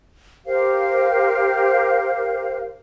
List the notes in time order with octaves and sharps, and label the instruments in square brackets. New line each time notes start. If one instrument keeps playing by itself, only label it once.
[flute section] G4 A#4 C5 F5